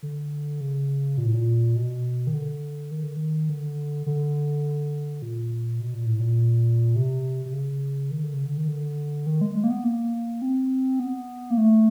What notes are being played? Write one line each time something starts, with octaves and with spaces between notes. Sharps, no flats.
D3
C#3
A#2
A2
A#2
B2
D#3
D3
D#3
D3
D#3
D3
D3
A#2
B2
A#2
A2
A#2
C3
C3
C#3
D#3
D3
C#3
D3
D#3
D3
D#3
G#3
G#3
A#3
B3
A#3
C4
B3
A#3
A3